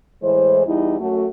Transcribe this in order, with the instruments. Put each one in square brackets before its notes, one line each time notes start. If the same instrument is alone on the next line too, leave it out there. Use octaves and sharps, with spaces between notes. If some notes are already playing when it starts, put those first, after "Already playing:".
[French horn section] A2 E3 G#3 C5
E2 G3 D#4 E4
F#2 A3 F#4